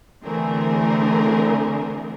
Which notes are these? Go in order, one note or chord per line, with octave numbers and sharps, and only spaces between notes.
D3 E3 A3 C4 G#4 A#4